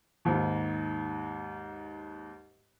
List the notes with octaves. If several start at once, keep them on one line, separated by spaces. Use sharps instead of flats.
D#2 G#2